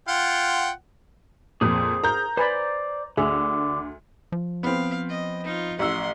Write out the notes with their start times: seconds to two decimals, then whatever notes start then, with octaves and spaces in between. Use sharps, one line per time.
0.08 F4 F#5 G5
1.61 F2 A#2 G#4 C5
2.04 A#4 A#5 G6
2.37 B4 C5 D5 G#5 B5
3.17 D2 D3 G#4 E5
4.32 F3
4.63 B3 C4 F5
5.09 D#5
5.44 D#4 F4
5.79 A1 F#5 C6 E6